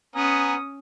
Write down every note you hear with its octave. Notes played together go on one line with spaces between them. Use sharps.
B3 C#4 G#5 A#5 D#6